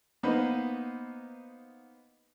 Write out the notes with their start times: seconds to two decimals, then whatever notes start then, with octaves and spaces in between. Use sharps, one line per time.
0.23 A#3 B3 D#4 B4 C5